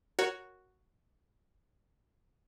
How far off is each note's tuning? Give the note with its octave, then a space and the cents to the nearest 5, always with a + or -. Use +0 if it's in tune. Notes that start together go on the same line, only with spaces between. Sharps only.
F#4 +0 A#4 +0 C#5 +0